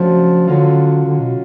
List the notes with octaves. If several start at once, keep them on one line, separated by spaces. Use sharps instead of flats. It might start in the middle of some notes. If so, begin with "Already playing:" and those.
Already playing: C#3 F3 F#3 A3 D4 F#4
D3 F#3 C#4 F4
D3
B2